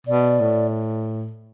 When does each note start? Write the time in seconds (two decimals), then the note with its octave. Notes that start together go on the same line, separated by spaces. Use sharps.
0.07 B2 D5
0.40 A2